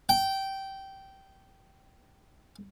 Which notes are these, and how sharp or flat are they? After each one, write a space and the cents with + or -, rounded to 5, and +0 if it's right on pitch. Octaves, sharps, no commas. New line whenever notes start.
G5 -15